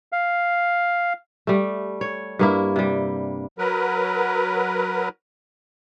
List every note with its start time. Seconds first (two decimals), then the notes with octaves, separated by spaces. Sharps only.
0.12 F5
1.47 G3 A3
2.01 C#5
2.39 G2 A#3 E4
2.76 C3 G3
3.58 F#3 A#4 B4